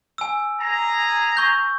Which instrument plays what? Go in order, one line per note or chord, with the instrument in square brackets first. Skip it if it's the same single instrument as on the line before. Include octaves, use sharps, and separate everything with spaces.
[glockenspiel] G#5 E6
[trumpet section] G#4 A#5
[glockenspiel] C#6 G6